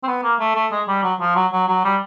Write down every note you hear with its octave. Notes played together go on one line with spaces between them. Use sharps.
C4
B3
A#3
A3
A3
G#3
G3
F#3
F3
F#3
F#3
F#3
G3